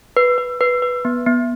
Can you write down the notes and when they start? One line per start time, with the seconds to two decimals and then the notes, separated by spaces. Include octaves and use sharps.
0.17 B4
0.38 B4
0.61 B4
0.82 B4
1.05 B3
1.26 B3